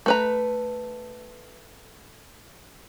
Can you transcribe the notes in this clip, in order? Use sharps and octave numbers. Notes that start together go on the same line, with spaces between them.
A3 B4 A#5